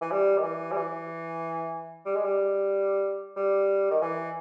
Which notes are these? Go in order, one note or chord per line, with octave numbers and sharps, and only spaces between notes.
E3
G3
D#3
E3
G3
E3
G3
G#3
G3
G3
D#3
E3